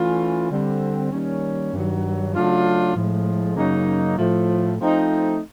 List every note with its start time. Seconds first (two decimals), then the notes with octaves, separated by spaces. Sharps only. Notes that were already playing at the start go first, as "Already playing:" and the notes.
Already playing: E3 A3 C#4 F4
0.51 D3 G3 C4
1.12 D#3 G3 A#3 C#4
1.73 G2 D#3 F#3
2.34 C#3 F#3 A3 D4 F4
2.95 A2 F3 G#3
3.56 F#2 C#3 F#3 A#3 D#4
4.18 A2 F3 A3
4.79 F3 A3 C4 D#4